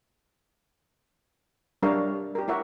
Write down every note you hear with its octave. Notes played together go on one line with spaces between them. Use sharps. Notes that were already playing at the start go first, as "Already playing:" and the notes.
G3 D4 A#4 C#5 E5 F5
G4 A#4
E4 A#4 C#5 E5 F#5